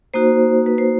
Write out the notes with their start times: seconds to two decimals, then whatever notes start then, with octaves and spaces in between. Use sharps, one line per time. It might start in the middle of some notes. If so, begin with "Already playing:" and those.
0.14 A#3 D#4 F#4 C5
0.66 B4
0.78 C5